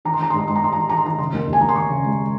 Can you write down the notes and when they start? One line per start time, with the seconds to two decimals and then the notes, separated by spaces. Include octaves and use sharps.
0.05 D#3 A#5
0.13 C6
0.19 D#3 A#5
0.30 C6
0.34 G#2 A#5
0.48 G#2 C6
0.55 A#5
0.62 G#2 C6
0.73 A#5
0.77 D#3 C6
0.89 D#3 A#5
0.97 C6
1.05 D#3 A#5
1.18 C#3 C6
1.33 D#2
1.48 D#2
1.53 G#5
1.61 D#2 A#5
1.69 C6
1.75 D#2 C#6
1.90 C#3
2.04 G#3